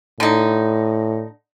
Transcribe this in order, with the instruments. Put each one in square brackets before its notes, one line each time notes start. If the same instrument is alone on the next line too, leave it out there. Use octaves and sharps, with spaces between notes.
[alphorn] A2 [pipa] D3 D#4